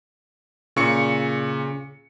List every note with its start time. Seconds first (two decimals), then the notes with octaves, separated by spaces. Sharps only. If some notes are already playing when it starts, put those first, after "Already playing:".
0.76 A#2 C#3 C#6 C#7